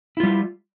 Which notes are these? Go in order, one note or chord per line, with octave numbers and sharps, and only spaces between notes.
G3 E4 F4